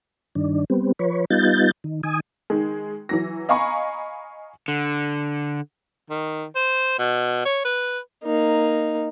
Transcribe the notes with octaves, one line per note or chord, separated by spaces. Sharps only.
G2 D#3 D4
G3 B3 C4
F3 B4 C#5
G3 B3 D#4 F4 G6 A6
D#3
D#3 G#5 D#6
D#3 G#3
E3 F#3 A#6
D#5 F5 G#5 A#5 B5 C#6
D3
D#3
C5
B2
C#5
B4
A#3 D#4